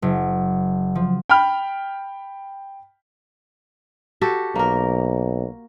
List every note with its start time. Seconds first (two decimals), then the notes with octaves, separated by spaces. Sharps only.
0.02 F#1
0.95 F3
1.29 G5 B5 F6
4.21 F#4 G4 A4
4.55 B1 A#3 A#4